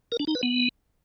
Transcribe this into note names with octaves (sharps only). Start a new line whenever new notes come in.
A#4
D4
D#4
B4
B3